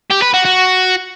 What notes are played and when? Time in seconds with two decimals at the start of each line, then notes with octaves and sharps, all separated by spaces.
0.11 G4
0.22 B4
0.34 F#4
0.45 F#4